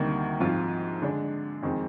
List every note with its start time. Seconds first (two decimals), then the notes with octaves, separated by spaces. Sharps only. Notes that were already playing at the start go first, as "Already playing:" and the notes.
Already playing: D2 C3 D#3 G3 A#3
0.40 G#2 F3 C4 F4
1.02 D3 G#3 D4
1.63 F2 D#3 G#3 C4